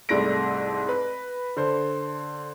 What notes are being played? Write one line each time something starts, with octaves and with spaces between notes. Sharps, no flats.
C2 G#2 G3 A3 A#6 D7
B4
D3 C5